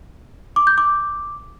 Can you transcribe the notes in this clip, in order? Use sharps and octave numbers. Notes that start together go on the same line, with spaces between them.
D6
G6
D6